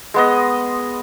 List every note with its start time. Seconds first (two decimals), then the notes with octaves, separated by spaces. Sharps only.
0.14 G#3 B3 D#5